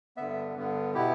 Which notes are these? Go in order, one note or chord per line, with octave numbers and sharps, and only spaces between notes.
G2 D3 B3 E5
G2 D3 B3
B2 B3 E4 G4